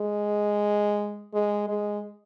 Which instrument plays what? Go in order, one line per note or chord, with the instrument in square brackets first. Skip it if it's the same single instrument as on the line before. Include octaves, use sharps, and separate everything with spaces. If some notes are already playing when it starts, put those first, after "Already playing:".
Already playing: [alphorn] G#3
G#3
G#3